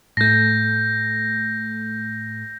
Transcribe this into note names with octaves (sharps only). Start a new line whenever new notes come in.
A2 A3 G6 A#6